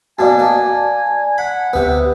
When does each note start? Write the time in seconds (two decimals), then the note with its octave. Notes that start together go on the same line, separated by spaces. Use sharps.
0.19 F#2 B2 A#3 D5 G#5 A5
0.39 A#3
1.38 F#5 B5
1.73 D2 C3 B3 B4